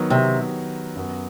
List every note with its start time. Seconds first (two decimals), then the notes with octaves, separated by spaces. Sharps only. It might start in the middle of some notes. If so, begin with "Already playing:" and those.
Already playing: D#3 F#3 B3
0.10 C3
0.96 F#2 F#3 B3